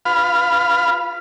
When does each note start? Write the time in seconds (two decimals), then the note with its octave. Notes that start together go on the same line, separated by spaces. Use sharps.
0.05 F4 B4 F5 B5 F6